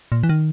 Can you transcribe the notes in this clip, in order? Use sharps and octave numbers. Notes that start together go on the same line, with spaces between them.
A#2
E3
D#3